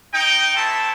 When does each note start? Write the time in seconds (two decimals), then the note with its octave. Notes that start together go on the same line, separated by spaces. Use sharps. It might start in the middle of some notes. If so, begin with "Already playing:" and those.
0.14 D#4 G5
0.56 A3 C4 E4 A4 G5 A5